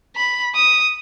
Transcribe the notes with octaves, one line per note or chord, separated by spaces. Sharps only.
B5
D#6